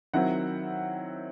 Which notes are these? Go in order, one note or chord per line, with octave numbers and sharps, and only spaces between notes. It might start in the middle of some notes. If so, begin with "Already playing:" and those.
D#3 F#3 C4 E4 F#5